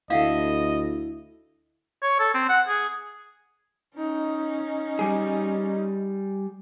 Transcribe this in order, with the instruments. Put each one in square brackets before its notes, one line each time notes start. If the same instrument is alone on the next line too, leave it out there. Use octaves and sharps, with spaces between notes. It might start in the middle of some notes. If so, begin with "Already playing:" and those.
[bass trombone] D2 [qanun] E4 A4 [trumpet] D#5 [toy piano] F5 F#5
[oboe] C#5
A4
C4
F#5
G#4
[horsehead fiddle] C#4 D#4
[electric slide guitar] G3 G#4